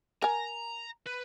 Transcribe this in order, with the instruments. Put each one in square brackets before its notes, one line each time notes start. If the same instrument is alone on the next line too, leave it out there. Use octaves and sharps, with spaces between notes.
[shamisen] A#4 G#5 [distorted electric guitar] A#5
[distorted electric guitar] B4